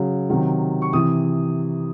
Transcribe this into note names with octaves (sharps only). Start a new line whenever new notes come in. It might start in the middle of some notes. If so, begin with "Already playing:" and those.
Already playing: C#3 F#3
C3 D#3 F#3
C#6
C3 E3 D#6